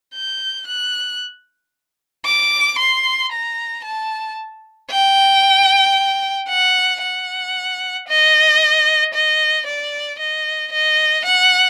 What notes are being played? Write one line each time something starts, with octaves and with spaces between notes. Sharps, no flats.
G6
F#6
D6
C6
A#5
A5
G5
F#5
F#5
D#5
D#5
D5
D#5
D#5
F#5